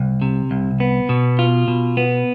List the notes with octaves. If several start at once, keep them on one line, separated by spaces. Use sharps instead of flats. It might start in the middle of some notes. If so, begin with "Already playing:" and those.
Already playing: C2
C3
C2
B3
B2
F4
B2
B3